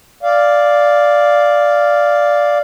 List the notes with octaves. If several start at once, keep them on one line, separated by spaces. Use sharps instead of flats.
D5 F5